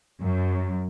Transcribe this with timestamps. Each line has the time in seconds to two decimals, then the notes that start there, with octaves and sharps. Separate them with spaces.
0.21 F#2